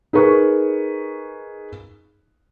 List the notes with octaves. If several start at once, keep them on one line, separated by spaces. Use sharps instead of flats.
D#4 G#4 A#4 B4 C#6